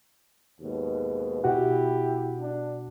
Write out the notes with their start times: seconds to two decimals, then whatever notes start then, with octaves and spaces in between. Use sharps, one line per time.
0.61 D#2 G#2 B2
1.44 B2 E4 F#4 G4 F#5
2.39 D4